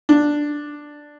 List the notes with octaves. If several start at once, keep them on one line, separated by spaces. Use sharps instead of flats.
D4